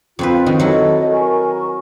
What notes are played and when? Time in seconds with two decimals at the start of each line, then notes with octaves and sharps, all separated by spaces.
0.19 F2 C4 D#4 F4 B4
0.46 D#3 F#4
0.60 F#3 E4 A4 D#5
1.11 A#4 G#5 C#6